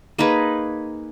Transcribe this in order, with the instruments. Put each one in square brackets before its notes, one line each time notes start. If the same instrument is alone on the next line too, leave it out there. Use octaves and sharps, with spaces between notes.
[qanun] A#3 D#4 G#4 B4